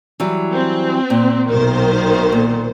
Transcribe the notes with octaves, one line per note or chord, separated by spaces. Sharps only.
E3 F#3 G3
C4
A#2
B1 D#3 C5
A#2